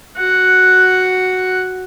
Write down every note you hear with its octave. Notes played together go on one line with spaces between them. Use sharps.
F#4 F#5